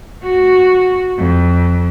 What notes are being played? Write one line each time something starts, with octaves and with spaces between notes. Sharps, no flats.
F#4
F2